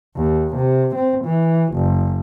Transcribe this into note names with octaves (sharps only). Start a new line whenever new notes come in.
D#2
C3
C4
E3
F#1